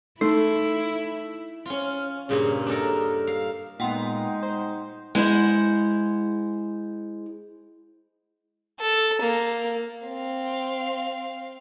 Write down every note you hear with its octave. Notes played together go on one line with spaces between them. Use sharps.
A3 D#4 E4
C#4 F4
G2 A#2 C#3
D4 D#4 A4 A#4
F5
A#2 G#3 B3 D#4 F#5 G5 C6
C5
G#3 E4 C5 F#5
A4
A#3
C4 F5